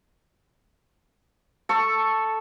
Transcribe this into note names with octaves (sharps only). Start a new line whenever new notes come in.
A4 C#6